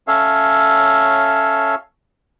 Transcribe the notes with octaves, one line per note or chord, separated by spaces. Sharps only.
C#4 A4 C#5 E5 F5